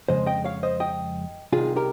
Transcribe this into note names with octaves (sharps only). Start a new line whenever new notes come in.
F2 C#3 G#3 C5 D#5
D#5 G5
C#5 F5
C5 D#5
D#5 G5
C2 C3 D#3 F4 G#4
G4 A#4